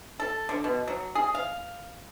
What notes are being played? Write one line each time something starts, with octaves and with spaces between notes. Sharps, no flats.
A4
D3
B2
F#3
G#4
F5